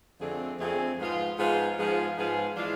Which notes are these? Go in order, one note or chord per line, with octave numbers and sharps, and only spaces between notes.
F2 D3 A3 C4 G#4
F2 D3 A3 C4 G#4
G#2 F3 B3 F4 G#4
G#2 F3 B3 F4 G#4
G#2 F3 B3 F4 G#4
G#2 F3 B3 F4 G#4
E3 G#3 D4 F4